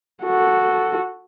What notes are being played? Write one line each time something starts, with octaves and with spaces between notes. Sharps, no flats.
F#4 A4